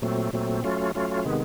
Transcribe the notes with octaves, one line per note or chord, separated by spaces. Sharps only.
A#2 F#3 A3 C4
A#2 F#3 A3 C4
F#3 A3 C#4 F4
F#3 A3 C#4 F4
C3 D#3 G#3 B3